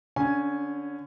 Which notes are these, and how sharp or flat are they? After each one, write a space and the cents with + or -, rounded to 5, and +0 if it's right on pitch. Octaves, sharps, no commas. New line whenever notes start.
D3 -20 C#4 +0 G#5 +0